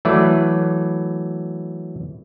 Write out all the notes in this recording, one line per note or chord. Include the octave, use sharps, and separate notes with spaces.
E3 F#3 A3 B4 D5